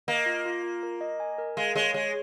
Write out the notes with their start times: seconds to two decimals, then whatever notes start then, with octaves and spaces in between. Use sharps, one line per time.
0.08 A#3 D#5
0.26 F4
0.46 F4
0.63 F4
0.83 A#4
1.01 D#5
1.20 G#5
1.38 A#4
1.57 G#3 F5
1.75 G#3 C#5
1.94 G#3 C#5